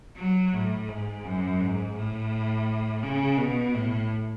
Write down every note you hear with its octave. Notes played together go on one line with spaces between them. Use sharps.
F#3
A2
G#2
F#2
G#2
A2
C#3
B2
A2